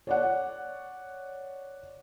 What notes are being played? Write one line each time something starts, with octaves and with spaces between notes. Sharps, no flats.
C#5 D5 F#5